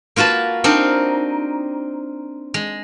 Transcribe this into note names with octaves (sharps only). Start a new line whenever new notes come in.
A#3 F4 F#4 B4 A5
C4 D4 D#4 A#4
G#3